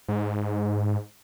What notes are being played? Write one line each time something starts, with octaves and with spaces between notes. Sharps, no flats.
G#2